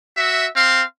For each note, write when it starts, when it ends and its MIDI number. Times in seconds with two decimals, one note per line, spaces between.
0.17 0.46 66
0.17 0.46 76
0.55 0.82 60
0.55 0.82 77
0.55 0.82 84